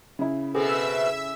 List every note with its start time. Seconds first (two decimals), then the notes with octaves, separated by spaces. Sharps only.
0.19 C#3 E4
0.55 B2 B3 C4 G#4 A4 E5 G#5 E6